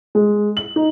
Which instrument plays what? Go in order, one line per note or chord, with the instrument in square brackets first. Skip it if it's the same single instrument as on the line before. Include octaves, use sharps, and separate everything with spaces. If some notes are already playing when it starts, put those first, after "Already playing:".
[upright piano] G#3
F#7
D#4